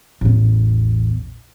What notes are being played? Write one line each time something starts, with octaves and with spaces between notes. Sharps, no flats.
A1 E2